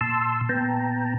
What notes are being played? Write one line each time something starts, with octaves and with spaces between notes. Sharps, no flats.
A#2 A5 C6 E6
A#2 B3 G5 A5 A#5